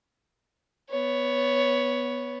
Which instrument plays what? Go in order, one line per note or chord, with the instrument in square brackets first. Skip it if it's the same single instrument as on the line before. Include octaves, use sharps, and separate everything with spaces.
[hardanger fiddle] B3 C#5